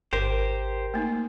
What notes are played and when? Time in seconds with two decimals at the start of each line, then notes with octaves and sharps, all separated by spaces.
0.13 G#1 G4 A#4 C5
0.94 A3 A#3 D#4